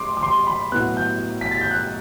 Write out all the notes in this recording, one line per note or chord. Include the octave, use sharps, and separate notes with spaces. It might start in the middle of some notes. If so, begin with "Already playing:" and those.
Already playing: A3 C6 D6
D6
C6
B5
A2 F#3 B3 F#6
G6
B6
A6
G6
F#6